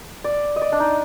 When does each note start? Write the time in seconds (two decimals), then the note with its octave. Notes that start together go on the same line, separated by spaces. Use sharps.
0.24 D5
0.56 D#5
0.62 D5
0.72 D4
0.80 D#4